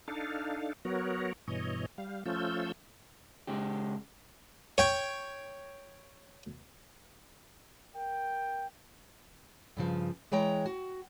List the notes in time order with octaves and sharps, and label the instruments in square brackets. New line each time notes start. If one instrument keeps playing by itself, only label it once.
[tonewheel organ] D4 D#4 A4 F5
F#3 B3 F#4 A#4 C#5
G2 B2 E3 C#5 D#5
G3 F5
F3 A3 C#4 F4 E6 G6
[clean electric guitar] C#3 G#3 C#4 G4
[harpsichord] C#5 G5
[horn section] A#4 G5
[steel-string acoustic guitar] G2 C#3 F3
E3 G#3 C#5 G5 A#5
F#4